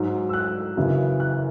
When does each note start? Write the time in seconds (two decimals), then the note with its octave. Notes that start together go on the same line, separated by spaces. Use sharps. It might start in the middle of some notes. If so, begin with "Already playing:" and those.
Already playing: G#2 F#3
0.29 E6
0.33 F#6
0.77 F#2 C#3 E3
1.20 F#6